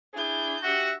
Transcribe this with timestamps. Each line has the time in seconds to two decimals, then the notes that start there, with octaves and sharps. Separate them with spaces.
0.14 D4 E4 G#4 G6
0.63 F#4 G4 E5 F#5